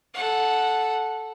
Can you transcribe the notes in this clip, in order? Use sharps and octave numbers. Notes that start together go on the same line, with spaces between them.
A4 F#5